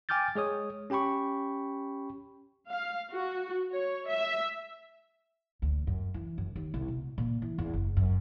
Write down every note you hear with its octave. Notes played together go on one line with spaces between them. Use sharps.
G5 G#5 D6 F6 G6 A6
G#3 G#4 C#5 D#6
C#4 G4 G5 B5 C#6
F5
F#4
C#5
E5
D2
F#2
E3
F#2
D#2
C2
B2
A#2
E3
E2
F#1
F#2